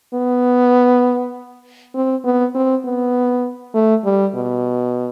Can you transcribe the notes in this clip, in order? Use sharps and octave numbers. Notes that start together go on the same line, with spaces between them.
B3
C4
B3
C4
B3
A3
G3
B2